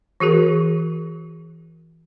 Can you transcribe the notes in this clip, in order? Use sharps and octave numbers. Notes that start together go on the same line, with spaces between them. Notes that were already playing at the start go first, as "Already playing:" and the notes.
E3 F#4 G#4 A#4